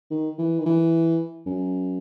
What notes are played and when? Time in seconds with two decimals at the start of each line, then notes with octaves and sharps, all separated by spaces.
0.10 D#3
0.38 E3
0.60 D#3
0.66 E3
1.46 F#2